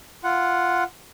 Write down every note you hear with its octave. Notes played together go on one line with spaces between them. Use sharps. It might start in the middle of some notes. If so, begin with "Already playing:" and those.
F4 F#5